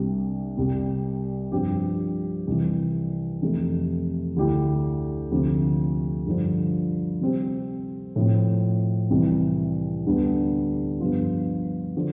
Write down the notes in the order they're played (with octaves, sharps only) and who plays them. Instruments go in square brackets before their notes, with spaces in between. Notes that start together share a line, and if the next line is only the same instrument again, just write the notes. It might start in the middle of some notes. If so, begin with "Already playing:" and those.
Already playing: [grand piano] C2 C3 G3 D4 G4
C2 C3 G3
G2 F3 C4 G4
C2 C3 E3
F2 C3 E3 A3
D2 D3 A3 E4 G4
D2 C3 F3
G2 D3 F3
C3 G3 C4 G4
A2 F3 C4
C2 C3 E3
D2 D3 G3 B3 D4
G2 F3 B3 F4
D3 F3